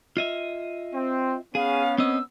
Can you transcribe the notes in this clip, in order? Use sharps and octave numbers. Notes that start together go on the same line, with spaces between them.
F4 D#5 E5
C4
B3 C#4 G#4 F5
C4 D#5 E6